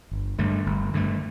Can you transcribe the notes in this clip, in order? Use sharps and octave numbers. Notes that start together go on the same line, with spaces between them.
G1
G2 D3 A3
G1
G2 D3 A3